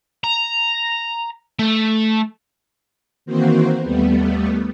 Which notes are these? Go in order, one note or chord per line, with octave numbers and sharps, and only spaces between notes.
A#5
A3
D#3 E3 A#3 C4 F#4 C5
D#2 G3 A3 B3